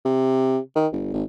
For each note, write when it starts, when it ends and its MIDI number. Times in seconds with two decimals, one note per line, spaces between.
0.05 0.59 48
0.75 0.87 51
0.92 1.11 31
1.13 1.23 32